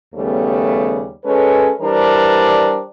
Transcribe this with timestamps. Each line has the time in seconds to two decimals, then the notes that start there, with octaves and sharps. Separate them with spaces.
0.15 D#2 C#3 G3 A3 B3
1.25 G#3 C#4 A4 B4 C#5
1.81 E3 G3 D4 A#4 C5